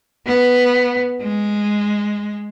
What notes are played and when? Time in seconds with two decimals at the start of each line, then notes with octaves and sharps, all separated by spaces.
0.27 B3
1.22 G#3